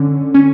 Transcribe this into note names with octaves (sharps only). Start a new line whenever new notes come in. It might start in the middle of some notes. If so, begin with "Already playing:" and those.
Already playing: D3 C#4
C#4